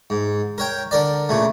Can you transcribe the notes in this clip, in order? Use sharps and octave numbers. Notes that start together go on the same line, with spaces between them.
G#2
A#4 C#5 G5
D3 A#4 D5
A#2 C#3 A3